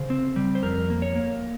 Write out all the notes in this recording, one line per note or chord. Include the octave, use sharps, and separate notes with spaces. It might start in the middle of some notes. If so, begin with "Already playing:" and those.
Already playing: C#3 C5
C4
G3
C5
F2 A#4
A#3
C#5
A#3